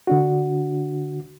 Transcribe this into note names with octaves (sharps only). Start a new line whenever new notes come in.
D3 D4 F#4